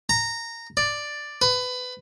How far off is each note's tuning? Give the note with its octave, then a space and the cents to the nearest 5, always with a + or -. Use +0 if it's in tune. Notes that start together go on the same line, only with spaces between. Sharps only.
A#5 -15
D5 +5
B4 +20